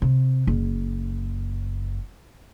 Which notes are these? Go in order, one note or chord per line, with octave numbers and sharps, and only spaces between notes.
C3
F#1